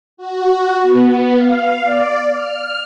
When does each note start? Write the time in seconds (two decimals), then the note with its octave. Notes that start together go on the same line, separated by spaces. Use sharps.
0.17 F#4
0.82 B3
1.36 F5
1.82 D5
2.32 F6